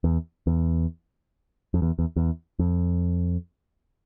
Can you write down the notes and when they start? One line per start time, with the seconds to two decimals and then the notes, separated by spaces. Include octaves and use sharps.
0.04 E2
0.47 E2
1.74 F2
1.82 E2
1.99 E2
2.16 E2
2.59 F2